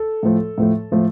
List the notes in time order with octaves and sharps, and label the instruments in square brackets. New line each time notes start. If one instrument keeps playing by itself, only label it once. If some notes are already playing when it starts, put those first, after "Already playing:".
Already playing: [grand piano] A4
A2 F3 A3
A2 F3 A3
A2 F3 A3